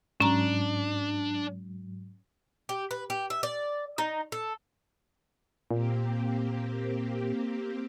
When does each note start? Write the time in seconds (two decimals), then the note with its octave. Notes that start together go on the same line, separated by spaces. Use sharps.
0.20 G#2 F#3 C#4 D4 A#5
2.69 G4
2.91 B4
3.10 G4
3.30 E5
3.43 D5
3.98 D#4
4.32 A4
5.71 A#2 A#3 C4 G4